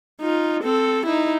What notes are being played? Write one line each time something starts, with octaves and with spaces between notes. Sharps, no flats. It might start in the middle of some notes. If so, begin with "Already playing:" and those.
D#4 F4
C4 A4
D#4 E4